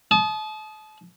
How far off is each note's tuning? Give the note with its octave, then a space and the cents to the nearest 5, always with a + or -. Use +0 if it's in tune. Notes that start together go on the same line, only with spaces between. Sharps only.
A5 -35 D#6 +0